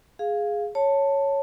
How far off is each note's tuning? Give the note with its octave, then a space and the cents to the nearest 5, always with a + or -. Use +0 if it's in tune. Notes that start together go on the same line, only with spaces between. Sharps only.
G#4 +0 F5 +0
C#5 +0 A5 +10